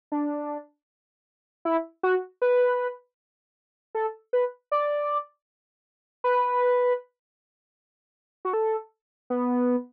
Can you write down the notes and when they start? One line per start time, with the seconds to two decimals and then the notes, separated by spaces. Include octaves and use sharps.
0.12 D4
1.65 E4
2.03 F#4
2.42 B4
3.95 A4
4.33 B4
4.72 D5
6.24 B4
8.45 F#4
8.53 A4
9.30 B3